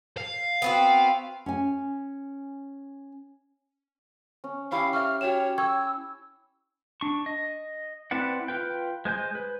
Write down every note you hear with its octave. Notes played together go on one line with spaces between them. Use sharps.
F5
B3 C4 F#4
C#4 G#5
C#4
C#4 E4 G4 F5
E5 C#6 F6
F#4 C#5 G5 E7
G5 C#6 E6 G#6
D4 C#6
D#5
C4 E4 B4 D5 F#5
F4 B4 G5
G#3 C5 G#5 G6
B4